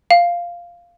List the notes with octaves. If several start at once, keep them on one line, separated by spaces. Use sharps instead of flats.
F5